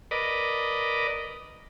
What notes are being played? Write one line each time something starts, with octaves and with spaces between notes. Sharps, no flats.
A#4 B4 D5 D#5